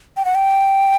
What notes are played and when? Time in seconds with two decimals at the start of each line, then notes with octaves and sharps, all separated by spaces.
0.17 G5
0.25 F#5
0.35 G5